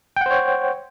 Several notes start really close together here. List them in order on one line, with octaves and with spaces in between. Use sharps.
G5 F#5 C5 C#5